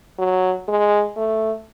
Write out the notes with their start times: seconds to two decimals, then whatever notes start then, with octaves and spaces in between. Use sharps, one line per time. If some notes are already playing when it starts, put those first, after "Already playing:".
0.18 F#3
0.68 G#3
1.17 A3